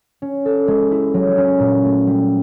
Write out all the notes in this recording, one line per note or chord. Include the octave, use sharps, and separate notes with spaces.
C#4
A4
G#3
E4
F#3
C#4
A#2
A3
G3